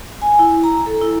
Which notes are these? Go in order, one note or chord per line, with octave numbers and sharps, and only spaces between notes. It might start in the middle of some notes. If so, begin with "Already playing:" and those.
G#5
E4
A#5
A4
E4